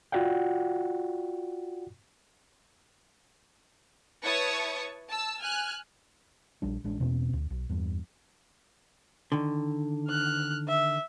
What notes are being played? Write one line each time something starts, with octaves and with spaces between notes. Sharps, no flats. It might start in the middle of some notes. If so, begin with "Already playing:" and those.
F4 F#4 D5 F#5 G5
E4 B4 C#5 A5 C#6 D#6
A5 E6
G#5 F6 F#6
A#1 G3 D4
A1 G#3 D4
E2 B2 C4 C#4
D2
B1
E2 G2
D3 D#3
F6 F#6
E5